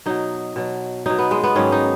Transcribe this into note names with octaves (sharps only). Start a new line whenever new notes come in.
B2 F#3 D#4
B2 F#3
B2 F#3 D#4
B3
G#3
B3
G#2 D#3 F#3 C#4
D#4